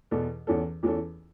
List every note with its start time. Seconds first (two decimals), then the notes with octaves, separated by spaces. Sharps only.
0.11 E2 B2 B3 A4
0.47 E2 E3 C#4 A4
0.83 E2 E3 C#4 A4